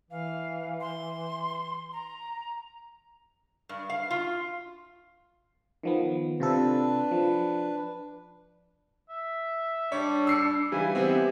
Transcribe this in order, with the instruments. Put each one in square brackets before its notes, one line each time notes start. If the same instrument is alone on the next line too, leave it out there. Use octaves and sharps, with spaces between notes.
[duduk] E3 [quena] F5
[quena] C6
A#5
[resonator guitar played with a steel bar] G2
F5
F4
[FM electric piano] D#3 F3 B3
[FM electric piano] C3 F4 A4 [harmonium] D4 B4
[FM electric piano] F3
[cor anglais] E5
[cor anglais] G3 [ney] D4 [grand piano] C#5
[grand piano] E6 C7 C#7
[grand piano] E3 G3 [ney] F5 [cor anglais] G#5
[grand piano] E3 B3 C4 [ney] G4